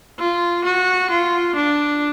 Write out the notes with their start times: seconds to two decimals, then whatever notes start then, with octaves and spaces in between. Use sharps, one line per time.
0.19 F4
0.64 F#4
1.10 F4
1.55 D4